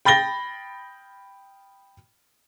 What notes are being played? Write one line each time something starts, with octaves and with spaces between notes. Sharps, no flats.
G5 B5 A6 A#6 G7